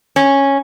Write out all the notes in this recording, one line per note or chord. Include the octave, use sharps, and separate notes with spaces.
C#4